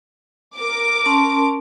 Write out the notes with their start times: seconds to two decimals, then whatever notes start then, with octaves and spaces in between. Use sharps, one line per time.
0.58 A#4 D6
1.06 C#4 A5 C6